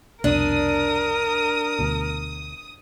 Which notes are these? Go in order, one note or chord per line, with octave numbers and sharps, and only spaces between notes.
C2 F2 B2 D4 A#4 D#6
D2 B2